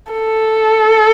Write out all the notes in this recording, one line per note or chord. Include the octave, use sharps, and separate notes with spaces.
A4